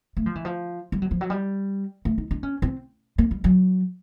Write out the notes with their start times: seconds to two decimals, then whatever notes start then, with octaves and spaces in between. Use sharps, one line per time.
0.17 A3
0.26 F3
0.35 E3
0.45 F3
0.92 G3
1.02 F#3
1.11 F3
1.21 F#3
1.30 G3
2.05 A3
2.18 D#4
2.31 D4
2.43 C#4
2.62 C4
3.18 A#3
3.31 G3
3.44 F#3